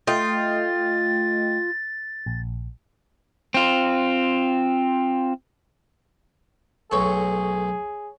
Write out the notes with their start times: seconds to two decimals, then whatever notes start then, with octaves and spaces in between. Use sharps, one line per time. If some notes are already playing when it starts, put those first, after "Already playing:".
0.07 A3 F4 D#5 G5 A6
2.26 A#1
3.54 C4 F4
6.91 B1 A2 G#4 C#5 C#6